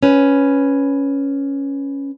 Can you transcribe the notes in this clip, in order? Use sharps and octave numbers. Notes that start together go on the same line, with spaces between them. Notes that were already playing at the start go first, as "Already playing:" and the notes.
C#4 B4